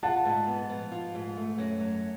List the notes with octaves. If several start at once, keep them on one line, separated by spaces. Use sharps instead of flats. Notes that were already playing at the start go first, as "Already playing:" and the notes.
F4 F#5 A5
G#2
B3
F3
F4
G#2
A3
F#2
F#3